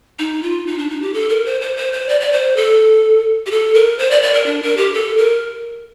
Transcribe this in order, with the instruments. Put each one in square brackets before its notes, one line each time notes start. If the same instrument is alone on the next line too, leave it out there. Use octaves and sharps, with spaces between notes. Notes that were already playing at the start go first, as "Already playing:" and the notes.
[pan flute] D#4
F4
D#4
D4
D#4
G4
A4
A#4
C5
C5
C5
C5
D5
D5
C5
A4
G4
A4
A#4
C5
D5
D5
A#4
D4
A#4
G4
A4
A#4